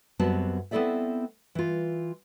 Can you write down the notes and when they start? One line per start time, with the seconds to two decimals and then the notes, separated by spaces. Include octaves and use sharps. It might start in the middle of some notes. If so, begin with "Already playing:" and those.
0.19 F#2 G3 B3 C4 F#4 A5
0.71 B3 C4 E4 A4 D5 E5
1.55 E3 F4